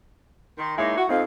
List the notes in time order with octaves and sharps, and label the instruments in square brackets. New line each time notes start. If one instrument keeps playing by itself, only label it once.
[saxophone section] D#3 [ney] C6
[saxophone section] G#3 A#3 D#4 [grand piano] E4 [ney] C#5
[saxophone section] F#4 [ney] F#5
[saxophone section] F2 [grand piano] C4 D#4 [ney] F5